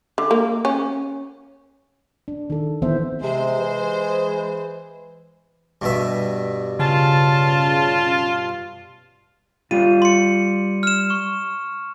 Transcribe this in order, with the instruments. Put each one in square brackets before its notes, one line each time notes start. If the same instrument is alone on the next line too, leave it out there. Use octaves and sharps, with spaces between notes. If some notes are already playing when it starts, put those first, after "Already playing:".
[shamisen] D3
A#3
C#4
[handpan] D4
D#3 A4
D#3 E3 B3 C4 C5 E5
[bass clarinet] C3 [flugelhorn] G#3 [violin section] C5
[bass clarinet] E3
[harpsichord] G2 B2 E5
[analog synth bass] C#3 [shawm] F4 [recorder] A5
[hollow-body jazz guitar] G3 F4 [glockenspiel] D#7
[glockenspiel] C6 C#7
F6 E7
C#6